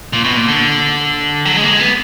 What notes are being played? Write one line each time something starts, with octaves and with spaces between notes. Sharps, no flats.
A#2
B2
A#2
D3
F#3
G#3
A#3
G#3
B3